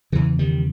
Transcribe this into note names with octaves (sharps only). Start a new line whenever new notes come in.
E2 C#3 E3
D#3 G3